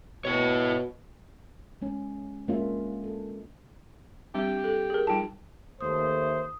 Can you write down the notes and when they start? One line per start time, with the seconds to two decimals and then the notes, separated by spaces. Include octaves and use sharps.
0.25 B2 E4 C#5
1.82 G#3 C#4
2.48 G#3 A#3 C#4 D4 F4 E5
3.04 A4
4.34 G3 C4 D4 G4
4.64 A4
4.90 G#4 A#4
5.07 G3 D#4 F4 G5 A5
5.81 D#2 A3 C5 D#6